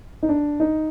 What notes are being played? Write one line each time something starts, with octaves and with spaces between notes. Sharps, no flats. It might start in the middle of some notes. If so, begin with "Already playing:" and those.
D#4
D4
D#4